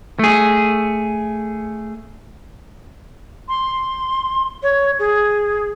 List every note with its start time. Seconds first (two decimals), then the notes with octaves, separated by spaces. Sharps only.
0.19 A3 G#4
3.49 C6
4.63 C#5
4.99 G#4